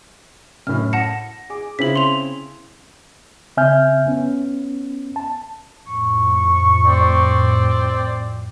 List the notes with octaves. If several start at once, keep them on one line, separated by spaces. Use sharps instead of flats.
F#2 A2 F6
F#5 A5 A#6 C#7
G#4 D6
C#3 C4 E4 B6 F#7
C6 F7
C#3 C4 E5 G#5 F6 G6
B3 C#4
A5
F2 A2 C#6
C4 D5